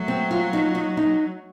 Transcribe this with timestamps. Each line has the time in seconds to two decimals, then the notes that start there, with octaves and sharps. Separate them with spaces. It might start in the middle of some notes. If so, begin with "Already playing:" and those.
Already playing: F#3 A3
0.08 C4
0.31 F4
0.53 D#4
0.75 D#4
0.97 D#4